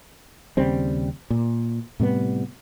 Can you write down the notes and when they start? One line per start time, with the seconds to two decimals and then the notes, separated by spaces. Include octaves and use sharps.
0.57 D#2 C#3 G3 C4
1.30 A#2
2.00 A2 C3 G3 B3